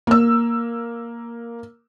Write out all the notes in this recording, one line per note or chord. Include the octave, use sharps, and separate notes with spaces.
A#3 E6